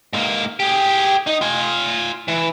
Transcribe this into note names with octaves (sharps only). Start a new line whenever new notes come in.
G#2 A#3
G4 G#4
D#4
F4 G#5
E3